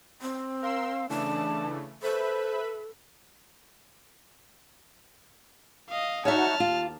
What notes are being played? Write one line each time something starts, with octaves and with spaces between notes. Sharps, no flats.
C4
A#4 F5 C6 E6
C#3 E3 A3 D4 A5
A4 B4 C5 E5 B5
D#5 F5
D#4 F#4 C#5 E5 F#5 A5 F6
D#2 F4